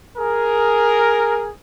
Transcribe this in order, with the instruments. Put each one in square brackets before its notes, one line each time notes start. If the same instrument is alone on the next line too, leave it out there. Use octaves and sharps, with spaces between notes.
[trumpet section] G#4 A#4